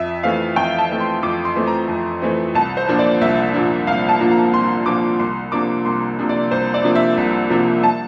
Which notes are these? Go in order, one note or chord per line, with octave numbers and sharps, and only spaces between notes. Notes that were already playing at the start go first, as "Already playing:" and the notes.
Already playing: F2 E5
E3 A3 C4 F5
F2 G5
A5
E3 A3 C4
C6
F2 D6
C6
E3 A3 C4
A#5
F2
E3 A3 C4
C2 A5
C5
A#2 F3 A#3 D4
D5
C2 E5
A#2 F3 A#3 D4
C2 F5
A5
A#2 F3 A#3 D4
A#5
C2 C6
A#2 F3 A#3 D4 D6
C2 C6
C3 F3 A#3 D4 D6
C2 C6
C3 F3 A#3 D4
D5
C2 C5
D5
C3 F3 A#3 D4
E5
C2
C3 F3 A#3 D4
A5